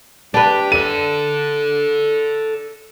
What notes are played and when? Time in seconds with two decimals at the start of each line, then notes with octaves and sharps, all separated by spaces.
0.34 D4 G4 B4
0.72 A4 D5 D#7